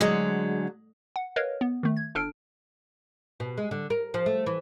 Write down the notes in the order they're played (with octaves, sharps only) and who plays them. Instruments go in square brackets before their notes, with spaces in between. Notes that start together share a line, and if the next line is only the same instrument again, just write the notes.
[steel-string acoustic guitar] D3 F#3 [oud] G#3
[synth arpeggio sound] F#5
A#4 B4 C#5 D#5 F5
B3
D#3 A3
G#6
G1 D4 A4 F6 D7
[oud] B2
G#3
D3
A#4
F3
A3
E3